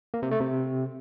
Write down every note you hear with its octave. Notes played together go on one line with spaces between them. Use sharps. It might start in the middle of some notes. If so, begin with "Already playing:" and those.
A#3
C3
A3
C3